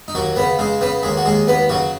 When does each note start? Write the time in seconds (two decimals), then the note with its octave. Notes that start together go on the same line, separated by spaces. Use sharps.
0.08 D#4
0.15 D#2 F#3 F#4
0.36 C#3 B3 B4
0.59 C#3 G#3 G#4
0.81 C#3 B3 B4
1.03 D#2 G#3 G#4
1.17 F#4
1.25 D#2 G#3 G#4
1.47 D#2 B3 B4
1.69 C#3 F#3 F#4